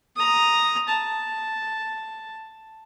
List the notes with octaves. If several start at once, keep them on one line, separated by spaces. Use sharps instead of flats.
A#5 D#6
A5